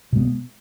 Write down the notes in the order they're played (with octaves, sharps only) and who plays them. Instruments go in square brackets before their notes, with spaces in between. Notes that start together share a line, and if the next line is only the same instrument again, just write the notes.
[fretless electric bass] B2 G#3 B3